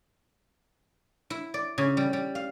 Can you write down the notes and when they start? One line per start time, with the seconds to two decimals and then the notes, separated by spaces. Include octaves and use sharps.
1.30 E4
1.54 D5
1.78 C#3
1.97 G3
2.13 G3
2.35 F5